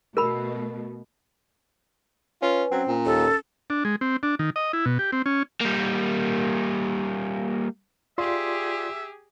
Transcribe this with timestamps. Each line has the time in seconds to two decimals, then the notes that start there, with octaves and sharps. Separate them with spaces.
0.17 B2 A3 A#4 B5
2.42 C#4 F4 B4 G#5
2.71 F#3 C4 C#4
2.88 A#2
3.06 D#2 A4
3.70 D4
3.85 G#3
4.01 C4
4.23 D4
4.39 D#3
4.56 D#5
4.73 E4
4.86 B2
4.99 G4
5.12 C4
5.26 C#4
5.61 G3 A#3
8.18 F4 G4 G#4 D5 E5 C6